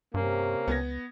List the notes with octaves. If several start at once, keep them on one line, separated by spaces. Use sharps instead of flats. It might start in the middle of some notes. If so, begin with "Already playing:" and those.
G2 C3 A#3 C#4
C#2 B3 G#6 A#6